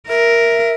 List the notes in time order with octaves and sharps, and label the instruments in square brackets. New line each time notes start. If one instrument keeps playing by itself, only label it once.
[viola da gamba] A#4 [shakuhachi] E5